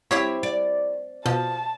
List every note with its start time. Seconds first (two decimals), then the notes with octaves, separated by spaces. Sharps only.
0.11 C4 E4 G4 C#5
0.43 D5
1.26 B2 F3 A5